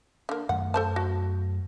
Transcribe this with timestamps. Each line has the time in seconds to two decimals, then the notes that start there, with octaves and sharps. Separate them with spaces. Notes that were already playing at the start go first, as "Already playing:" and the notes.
0.29 D3 A#3
0.49 F#2 D#3 A3 F#5
0.74 A4 C5 A5
0.96 F#4